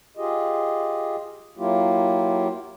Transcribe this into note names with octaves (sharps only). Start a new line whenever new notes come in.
F4 G4 G#4 D#5
F#3 A#3 E4 F4 G4